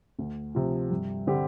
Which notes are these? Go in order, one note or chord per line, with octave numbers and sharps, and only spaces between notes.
D2
C3 F3
G2
D3 G3 C4 G4